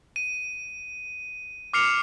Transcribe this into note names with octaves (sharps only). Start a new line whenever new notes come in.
D#7
D6 F6 C7 C#7 F7